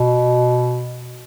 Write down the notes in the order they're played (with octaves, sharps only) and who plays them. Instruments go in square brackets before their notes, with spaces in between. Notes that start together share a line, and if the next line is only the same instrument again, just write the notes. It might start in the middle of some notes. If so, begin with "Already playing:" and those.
Already playing: [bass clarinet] B2